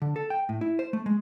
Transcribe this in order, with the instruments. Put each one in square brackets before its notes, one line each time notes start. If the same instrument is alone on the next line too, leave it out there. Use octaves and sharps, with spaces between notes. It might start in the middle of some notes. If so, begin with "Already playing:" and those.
[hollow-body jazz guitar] D3
A4
G5
A2
E4
C5
A3
G#3